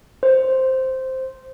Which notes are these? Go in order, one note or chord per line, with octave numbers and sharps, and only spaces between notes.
C5